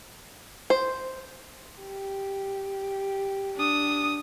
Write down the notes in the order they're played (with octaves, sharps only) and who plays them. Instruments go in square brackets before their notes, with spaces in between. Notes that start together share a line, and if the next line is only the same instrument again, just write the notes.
[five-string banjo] C5
[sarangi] G4
[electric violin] D4 D#6